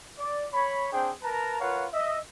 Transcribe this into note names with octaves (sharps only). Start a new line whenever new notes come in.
D5
C#5 B5
C4 D4 G#4 C5 G5
A#4 B4 A5 A#5
F4 A#4 B4 C#5 F5 F#5
D#5 E5